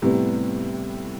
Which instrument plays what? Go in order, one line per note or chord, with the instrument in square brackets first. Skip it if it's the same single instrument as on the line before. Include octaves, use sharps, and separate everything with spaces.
[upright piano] A2 G3 B3 [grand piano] C3